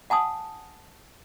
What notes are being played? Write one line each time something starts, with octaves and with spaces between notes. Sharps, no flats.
F#5 G#5 A5 D#6